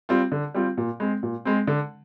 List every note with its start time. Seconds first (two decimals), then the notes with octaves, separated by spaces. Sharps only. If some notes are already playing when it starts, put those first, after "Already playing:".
0.09 G3 C4 F4
0.32 D3
0.54 G3 C4 F4
0.78 A#2
1.00 G#3 C4
1.23 A#2
1.45 G#3 C4
1.67 D3